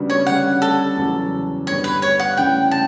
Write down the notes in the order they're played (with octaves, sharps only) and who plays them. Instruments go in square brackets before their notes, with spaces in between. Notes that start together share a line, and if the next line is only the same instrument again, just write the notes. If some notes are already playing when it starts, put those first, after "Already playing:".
Already playing: [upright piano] C#3 G3 B3 D4 F#4
[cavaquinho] C#5
[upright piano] D3 G3 C#4 [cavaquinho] F#5
[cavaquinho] A4
[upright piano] E2 C#3 F#3
[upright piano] G2 D3 G3 B3 [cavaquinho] C#5
[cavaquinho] B4
C#5
F#5
[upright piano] D2 C#3 G3 C#4 E4 [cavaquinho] G5
[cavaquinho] A5